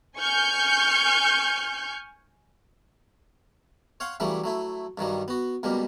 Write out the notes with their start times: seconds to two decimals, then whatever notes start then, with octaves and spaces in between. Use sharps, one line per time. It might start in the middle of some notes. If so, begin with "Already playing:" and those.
0.18 G#5 C#6 F6 G6
4.00 C#5 F5 F#5 C6
4.20 C#3 E3 F#3 G3 A3 D4
4.44 F#3 A3 E4
4.98 G2 D#3 F#3 G3
5.28 B3 F#4
5.63 C#2 B2 G3 A#3